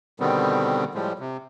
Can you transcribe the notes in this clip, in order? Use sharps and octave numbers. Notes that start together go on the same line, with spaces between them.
B2 D3 D#3 G3 B3 C4
A2 F3 G3 G#3
C3